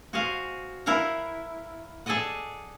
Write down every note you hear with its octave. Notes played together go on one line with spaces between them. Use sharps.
F#4 G#4 C5 D#5 F5
E4 A#4 F5 F#5 A#5
G#4 A4 D5 D#5 F#5